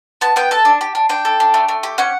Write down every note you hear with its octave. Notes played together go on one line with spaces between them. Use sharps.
B3 A5
B3 G5
A4 A5
D4
G4
D4
D4 G5
A4
D4
A3
A3
G4
C#4 F#5